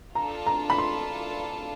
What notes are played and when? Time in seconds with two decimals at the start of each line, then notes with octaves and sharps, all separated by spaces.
0.15 D4 F4 A4 A#5
0.47 A#5
0.70 B5
0.78 C6